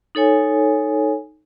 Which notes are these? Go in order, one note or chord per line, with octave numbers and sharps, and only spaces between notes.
D#4 A4 C#5 G#5